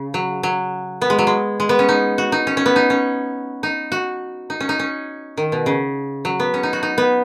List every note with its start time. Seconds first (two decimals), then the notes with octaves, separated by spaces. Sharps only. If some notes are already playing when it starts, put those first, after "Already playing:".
Already playing: C#3
0.14 F#3
0.43 F#3
1.01 B3
1.10 G#3
1.19 F#3
1.27 G#3
1.60 G#3
1.69 B3
1.79 C#4
1.89 D#4
2.18 F#4
2.32 D#4
2.47 C#4
2.57 C#4
2.66 B3
2.76 D#4
2.90 C#4
3.63 D#4
3.92 F#4
4.50 D#4
4.60 C#4
4.69 D#4
4.79 C#4
5.37 D#3
5.52 B2
5.66 C#3
6.25 F#3
6.40 B3
6.54 C#4
6.63 D#4
6.73 F#4
6.83 D#4
6.98 B3